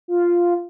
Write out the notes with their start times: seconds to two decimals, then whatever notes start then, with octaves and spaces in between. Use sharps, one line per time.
0.08 F4